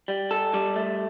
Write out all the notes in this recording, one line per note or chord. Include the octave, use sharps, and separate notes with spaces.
G3
A4
G3
A3